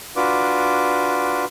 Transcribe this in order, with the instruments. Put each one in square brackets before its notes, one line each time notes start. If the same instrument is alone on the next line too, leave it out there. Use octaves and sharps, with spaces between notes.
[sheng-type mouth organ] D4 F4 F#4 B4 D6